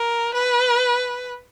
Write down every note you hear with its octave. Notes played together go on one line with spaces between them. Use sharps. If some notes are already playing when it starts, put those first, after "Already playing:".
Already playing: A#4
B4